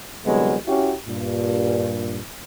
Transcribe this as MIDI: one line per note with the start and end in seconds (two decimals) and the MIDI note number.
0.25 0.56 36
0.25 0.56 50
0.25 0.56 54
0.25 0.56 56
0.25 0.56 59
0.66 0.93 61
0.66 0.93 64
0.66 0.93 66
0.66 0.93 67
1.07 2.19 43
1.07 2.19 46